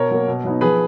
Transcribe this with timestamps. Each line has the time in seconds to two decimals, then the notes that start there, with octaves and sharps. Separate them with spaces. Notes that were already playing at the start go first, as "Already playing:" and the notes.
Already playing: B2 A#4 C#5
0.11 F#3 A#3
0.28 B2
0.44 F#3 B3 D#4
0.61 F3 G#4 B4